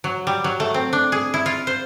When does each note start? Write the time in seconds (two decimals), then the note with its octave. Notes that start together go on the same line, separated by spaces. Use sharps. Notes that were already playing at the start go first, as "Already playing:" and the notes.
0.04 F#3
0.27 G3
0.44 F#3
0.60 A3
0.74 C4
0.93 D4
1.12 G#4
1.34 E4
1.46 F4
1.67 C5